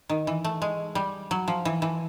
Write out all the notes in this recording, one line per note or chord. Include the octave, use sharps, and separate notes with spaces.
D#3
E3
A3
G#3
G3
F#3
F3
E3
E3